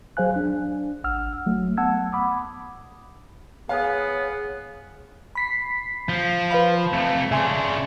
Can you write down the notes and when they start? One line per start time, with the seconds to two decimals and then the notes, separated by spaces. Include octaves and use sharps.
0.17 F#3 G#4 C5 F5 G#5 F#6
0.36 D4
1.04 G#1 F#5 E6 F6
1.46 F#3 A3
1.77 B3 F#5 A5 E6 G#6
2.13 B5 D6 D#6
3.69 B3 G#4 C#5 F5 G#5 D#6
5.35 B5 B6 C7
6.09 F3
6.51 B4 F5 B5
6.92 F2 A3
7.31 C#3 D4 E5 G#5 C6